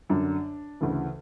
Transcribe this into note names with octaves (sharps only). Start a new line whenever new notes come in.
F#2 D3 D4
D2 C#3 E3